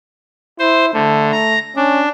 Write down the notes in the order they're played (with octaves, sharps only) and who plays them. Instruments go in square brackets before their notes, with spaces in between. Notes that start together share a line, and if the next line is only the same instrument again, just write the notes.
[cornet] E4 [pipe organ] C5
[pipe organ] D3 [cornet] A3
[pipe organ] A#5
[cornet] C#4 [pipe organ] D4